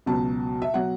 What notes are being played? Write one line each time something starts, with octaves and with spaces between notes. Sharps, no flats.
C#2 B2 F#3 A5
E5
B2 F#3 F#5